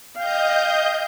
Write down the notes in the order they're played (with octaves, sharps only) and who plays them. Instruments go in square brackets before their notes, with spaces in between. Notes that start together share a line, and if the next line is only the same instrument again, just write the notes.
[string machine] D#5 G6 [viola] F5 G5